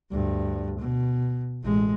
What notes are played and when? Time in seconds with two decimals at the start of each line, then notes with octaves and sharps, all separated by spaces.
0.11 D2 G2
0.80 B2
1.64 A1 G#3